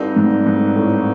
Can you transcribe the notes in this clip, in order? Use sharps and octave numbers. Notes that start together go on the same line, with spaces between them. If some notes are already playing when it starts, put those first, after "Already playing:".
Already playing: G2 D3 G3 C4 D#4
G#2
G#2
A2